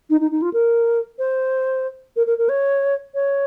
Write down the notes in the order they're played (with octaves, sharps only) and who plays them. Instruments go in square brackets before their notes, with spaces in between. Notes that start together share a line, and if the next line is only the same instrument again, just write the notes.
[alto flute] D#4
D#4
D#4
F4
A#4
C5
A#4
A#4
A#4
C#5
C#5